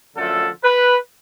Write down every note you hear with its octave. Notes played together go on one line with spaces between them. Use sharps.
F#2 D3 F3 A3 A4
B4